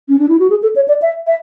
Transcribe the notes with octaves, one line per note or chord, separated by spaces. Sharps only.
C#4
D4
E4
F#4
G#4
A4
C#5
D5
E5
E5